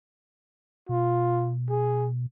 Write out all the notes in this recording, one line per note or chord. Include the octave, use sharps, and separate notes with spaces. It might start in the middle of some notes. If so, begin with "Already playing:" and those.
B2 F4
G#4